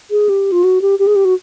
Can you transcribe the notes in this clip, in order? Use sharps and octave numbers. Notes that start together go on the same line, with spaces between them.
G#4
G4
F4
F#4
G4
G4
G#4
G4
F#4